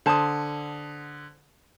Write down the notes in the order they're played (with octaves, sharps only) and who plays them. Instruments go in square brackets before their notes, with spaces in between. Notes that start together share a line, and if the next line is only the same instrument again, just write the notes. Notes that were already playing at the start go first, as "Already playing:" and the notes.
[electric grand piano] D3 D#6 [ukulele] C5 A5